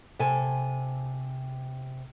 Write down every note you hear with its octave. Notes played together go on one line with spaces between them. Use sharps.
C3 A4 G#5